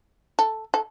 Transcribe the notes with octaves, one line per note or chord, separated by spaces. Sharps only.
A4
A4